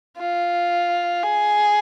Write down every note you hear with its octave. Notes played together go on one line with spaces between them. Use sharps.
F4
G#4